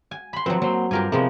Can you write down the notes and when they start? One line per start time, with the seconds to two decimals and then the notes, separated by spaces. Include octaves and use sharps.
0.11 G#5
0.33 B5 C6
0.46 F3 F#3 C4 F#4 B4
0.62 F#3 A#3 C5
0.91 G2 F4 G4 A#4 G#5
1.12 C3 F3 G#3 A#3 B3 E4